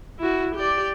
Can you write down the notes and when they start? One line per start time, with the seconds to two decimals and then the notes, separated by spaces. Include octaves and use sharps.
0.19 E4 F#4
0.54 G4 D5